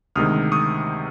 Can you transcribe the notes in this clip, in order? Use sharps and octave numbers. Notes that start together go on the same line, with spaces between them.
D2 C3 D#3 G#3 D#6 F6
C#6 D#6